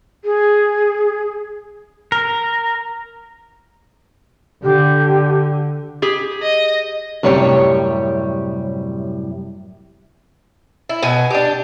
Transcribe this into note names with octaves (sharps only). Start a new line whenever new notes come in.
G#4
A#4
D3 G4
G4 G#4
D#5
F#2 A2 C3 G3 C#5
E4
B2 G#5
D4 G4